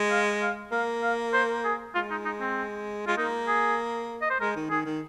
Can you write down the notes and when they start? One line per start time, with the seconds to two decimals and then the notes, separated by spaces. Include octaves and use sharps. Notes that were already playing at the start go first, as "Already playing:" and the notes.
Already playing: G#3
0.11 F5
0.42 F5
0.72 A#3 F5
1.03 F5
1.33 C5
1.65 G#4
1.95 G#3 F4
2.11 D#4
2.25 D#4
2.40 C4
3.07 G#3 F4
3.17 A#3 D#4
3.48 G#4
4.22 D#5
4.30 C5
4.40 G#3 A#4
4.56 D#3
4.70 D#3 G#4
4.86 D#3